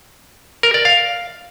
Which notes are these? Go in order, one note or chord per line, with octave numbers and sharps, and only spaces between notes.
A#4
D5
F5